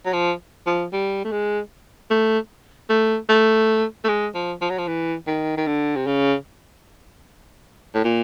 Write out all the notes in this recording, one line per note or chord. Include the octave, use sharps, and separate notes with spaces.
F#3
F3
F3
G3
A3
G#3
A3
A3
A3
A3
G#3
F3
F3
F#3
F3
E3
D#3
D#3
D3
C3
C#3
A2
A#2